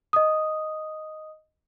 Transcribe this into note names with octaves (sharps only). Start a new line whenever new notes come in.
D#5 D#6